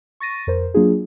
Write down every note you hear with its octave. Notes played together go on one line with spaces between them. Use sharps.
C#6 A6 A#6 D#7
F2 A#4 C5
F#3 A#3 D4 F4 G#4